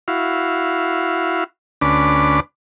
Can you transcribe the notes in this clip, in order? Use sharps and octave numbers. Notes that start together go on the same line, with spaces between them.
E4 F#4 F5
D2 C#4 D4 B4 D6